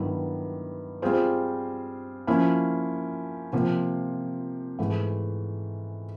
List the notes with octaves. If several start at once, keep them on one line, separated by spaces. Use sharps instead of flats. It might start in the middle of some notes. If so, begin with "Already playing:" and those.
Already playing: G2 D#3 F#3 B3 E4
G3 C4 F4 G#4 C5
F3 A#3 C#4 E4
C3 F3 A#3
G#2 E3 A3